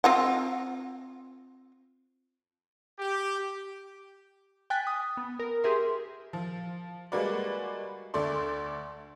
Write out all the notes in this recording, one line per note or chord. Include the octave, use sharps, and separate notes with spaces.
C4 F4 F#5
G4
G5 G#5 F#6 A6 B6
D#6
B3
A#4
G4 G#4 A#4 E5 C6
F3
G3 G#3 A#3 F#4 B4 D5
D2 A3 A4 D5 C6